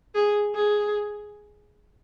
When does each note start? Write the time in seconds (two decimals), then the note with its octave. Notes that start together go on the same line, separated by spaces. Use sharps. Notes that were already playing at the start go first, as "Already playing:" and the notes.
0.15 G#4
0.55 G#4